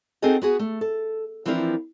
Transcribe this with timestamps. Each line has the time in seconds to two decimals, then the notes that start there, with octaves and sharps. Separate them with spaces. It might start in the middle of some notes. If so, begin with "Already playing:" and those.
0.22 C4 D#4 F#4 G#4 A4 D#5
0.42 B3 F#4 G#4
0.59 A3
0.81 A4
1.46 E3 F3 C4 D4 E4 A#4